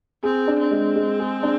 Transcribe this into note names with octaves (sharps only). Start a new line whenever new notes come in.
C4 G#4
D4
C4
G#3
G#3
G#4
D4